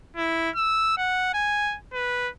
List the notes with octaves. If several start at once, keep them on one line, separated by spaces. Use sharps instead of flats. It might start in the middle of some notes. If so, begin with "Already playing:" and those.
E4
E6
F#5
G#5
B4